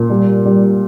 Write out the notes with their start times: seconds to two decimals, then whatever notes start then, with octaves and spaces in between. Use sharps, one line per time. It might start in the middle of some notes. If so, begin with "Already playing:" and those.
Already playing: A#2
0.10 G3
0.45 G3